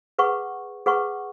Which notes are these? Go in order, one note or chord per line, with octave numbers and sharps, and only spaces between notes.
G#4 B4 F#5 C#6
G#4 B4 F#5 C#6